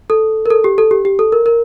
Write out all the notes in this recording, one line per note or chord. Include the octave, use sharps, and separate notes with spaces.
A4
A#4
A4
G4
A4
G4
G4
A4
A#4
A#4